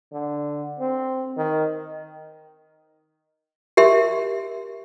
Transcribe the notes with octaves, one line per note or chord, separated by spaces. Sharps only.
D3
C4
D#3
G4 A#4 E5 C6